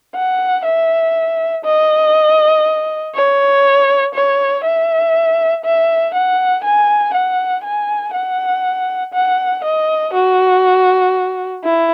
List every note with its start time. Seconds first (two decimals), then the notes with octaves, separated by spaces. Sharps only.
0.15 F#5
0.65 E5
1.65 D#5
3.14 C#5
4.14 C#5
4.64 E5
5.64 E5
6.14 F#5
6.64 G#5
7.14 F#5
7.64 G#5
8.14 F#5
9.14 F#5
9.64 D#5
10.13 F#4
11.64 E4